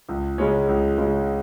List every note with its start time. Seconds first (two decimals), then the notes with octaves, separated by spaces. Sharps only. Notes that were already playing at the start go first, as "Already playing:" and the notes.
0.09 C#2
0.38 C#3 G#3 C#4
0.68 C#2
0.98 C#3 G#3 C#4